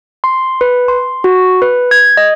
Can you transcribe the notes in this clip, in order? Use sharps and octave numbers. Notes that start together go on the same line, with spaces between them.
C6
B4
C6
F#4
B4
G#6
D#5